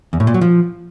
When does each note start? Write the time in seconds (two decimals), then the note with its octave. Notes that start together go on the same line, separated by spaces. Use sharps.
0.13 E2
0.20 A2
0.27 A#2
0.34 F#3
0.41 F3